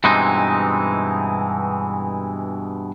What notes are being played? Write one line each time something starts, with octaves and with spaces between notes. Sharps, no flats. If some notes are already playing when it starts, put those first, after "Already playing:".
G2 B2 E3 G#3 C4 D#4